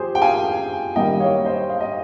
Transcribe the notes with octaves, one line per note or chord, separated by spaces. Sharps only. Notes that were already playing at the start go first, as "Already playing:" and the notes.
Already playing: F3 G#3 G4 G#4 C5
G5
F5 G#5
D#3 G3 A#3 D#5 G5
C#5 F5
C5 D#5
F5
D#5